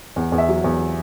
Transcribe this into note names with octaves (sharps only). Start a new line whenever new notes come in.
E2
E2
E5
F#3
E2